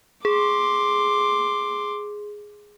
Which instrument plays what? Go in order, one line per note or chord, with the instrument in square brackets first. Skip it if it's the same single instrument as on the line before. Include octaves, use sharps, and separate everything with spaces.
[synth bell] G#4 [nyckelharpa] C6 D6